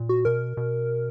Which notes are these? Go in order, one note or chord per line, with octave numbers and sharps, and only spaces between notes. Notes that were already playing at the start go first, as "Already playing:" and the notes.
Already playing: A#2
F#4
B2 A#4
B2